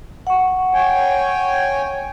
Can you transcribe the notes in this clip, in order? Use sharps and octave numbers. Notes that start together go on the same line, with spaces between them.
F#5 C#6
C#5 G5 G#5